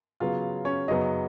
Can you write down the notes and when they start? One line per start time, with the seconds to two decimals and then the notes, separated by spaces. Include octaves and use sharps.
0.20 C#3 F#3 B3 F4 F5
0.65 C#4 C#5
0.88 F#2 C#3 F#3 B3 D#4 D#5